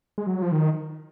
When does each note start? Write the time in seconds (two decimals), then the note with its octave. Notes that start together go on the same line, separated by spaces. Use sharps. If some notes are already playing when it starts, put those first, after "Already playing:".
0.18 G#3
0.27 F#3
0.42 F3
0.52 D#3